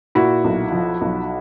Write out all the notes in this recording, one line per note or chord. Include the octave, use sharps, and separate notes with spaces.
A#2 E4 F#4
B1
F3
B1